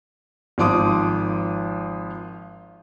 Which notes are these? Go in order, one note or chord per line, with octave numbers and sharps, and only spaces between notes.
G#1 F3 C6 D6 D#6